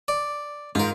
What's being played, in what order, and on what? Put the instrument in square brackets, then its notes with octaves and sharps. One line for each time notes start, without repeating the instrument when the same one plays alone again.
[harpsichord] D5
[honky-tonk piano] G#2 [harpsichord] F4 A#4